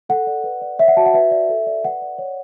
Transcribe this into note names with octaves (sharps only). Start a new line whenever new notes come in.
A4 F#5
D5
B4
D5
C#5 E5
F#5
F#4 A5
F#5
B4 E5
D5
A4
D5
B4 F#5
D5
C#5